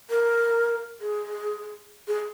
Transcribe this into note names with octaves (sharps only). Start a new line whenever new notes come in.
A#4
G#4
G#4